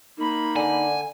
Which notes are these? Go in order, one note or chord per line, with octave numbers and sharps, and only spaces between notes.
A#3 D#4 B5
D3 G#5